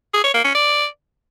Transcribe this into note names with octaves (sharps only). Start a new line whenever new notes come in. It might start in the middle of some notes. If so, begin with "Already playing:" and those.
G#4
C#5
A#3
C#4
D5